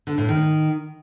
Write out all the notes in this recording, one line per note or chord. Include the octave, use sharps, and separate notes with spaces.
D3
A2
D#3